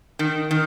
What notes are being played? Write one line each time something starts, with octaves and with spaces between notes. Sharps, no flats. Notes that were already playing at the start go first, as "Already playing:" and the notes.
D#3
D#3